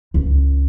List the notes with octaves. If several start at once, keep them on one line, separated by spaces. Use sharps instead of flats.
C#2